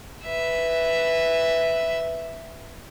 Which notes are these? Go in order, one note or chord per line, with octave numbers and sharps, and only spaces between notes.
B4 E5